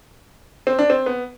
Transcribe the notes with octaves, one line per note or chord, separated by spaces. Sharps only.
C4
D4
C4
B3